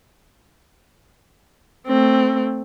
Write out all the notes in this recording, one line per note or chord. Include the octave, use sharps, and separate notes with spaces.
A3 C4